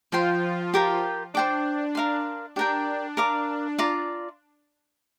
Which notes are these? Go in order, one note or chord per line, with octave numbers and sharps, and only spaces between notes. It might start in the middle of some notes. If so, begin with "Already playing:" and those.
F3 F4 C5 G5 C6
G4 A#4 G5
D4 C5 G5 D6
A#4 F5 C6
D4 G4 A#4 G5
A#4 F5 D6
F4 D5 A#5